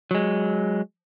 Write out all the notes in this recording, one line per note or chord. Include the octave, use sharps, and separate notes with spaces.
F#3 G#3